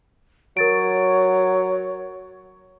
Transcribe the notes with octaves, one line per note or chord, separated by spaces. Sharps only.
F#3 A#4 C#5 A6 D7